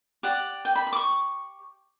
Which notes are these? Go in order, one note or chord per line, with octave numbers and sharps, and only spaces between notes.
G4 D5 F#5
G5
B5
B5
D6
C#6